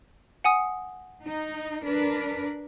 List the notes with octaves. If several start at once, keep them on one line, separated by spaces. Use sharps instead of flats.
F#5 G#5 D#6
D#4
D4 A#4 B4